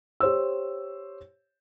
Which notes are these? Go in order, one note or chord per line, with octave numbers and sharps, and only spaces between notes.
G4 C5 C#5 E6